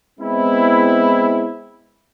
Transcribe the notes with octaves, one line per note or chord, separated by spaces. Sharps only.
G#3 B3 C4 E4